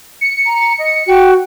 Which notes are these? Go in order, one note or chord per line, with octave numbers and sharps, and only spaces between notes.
C#7
A#5
D#5
F#4 G5